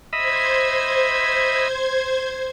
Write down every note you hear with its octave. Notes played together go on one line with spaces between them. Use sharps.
C5 D#5 E5 B5 G#6